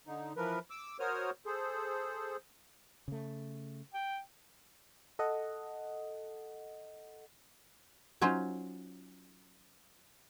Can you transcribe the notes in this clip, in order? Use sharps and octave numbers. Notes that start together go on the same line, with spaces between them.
D3 D#4
E3 F3 A#4 B4
D6 E6
F#4 A#4 C5 C#5 D#6 F6
G#4 A4 C5
C#3 A3
G5
A4 D#5 F#5
F#3 C#4 D#4 F4 C5